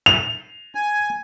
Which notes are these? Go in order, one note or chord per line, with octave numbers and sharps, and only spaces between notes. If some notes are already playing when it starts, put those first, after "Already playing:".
F7
G#5